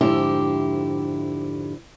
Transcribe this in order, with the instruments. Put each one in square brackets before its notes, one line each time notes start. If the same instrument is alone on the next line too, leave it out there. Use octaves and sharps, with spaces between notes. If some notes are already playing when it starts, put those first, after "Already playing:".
[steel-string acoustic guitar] F2 G#2 D3 E4 G4